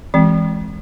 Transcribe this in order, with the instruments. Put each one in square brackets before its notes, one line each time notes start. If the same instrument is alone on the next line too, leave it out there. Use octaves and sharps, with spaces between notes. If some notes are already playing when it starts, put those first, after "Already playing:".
[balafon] E3 G#3 C4